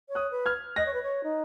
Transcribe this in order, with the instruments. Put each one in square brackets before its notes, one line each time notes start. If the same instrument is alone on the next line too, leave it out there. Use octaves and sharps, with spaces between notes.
[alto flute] C#5
[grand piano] D#6 F#6
[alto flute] B4
[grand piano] F6 G#6
[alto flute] D#5 [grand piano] F#6 A#6
[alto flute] C#5
B4
C#5
D#4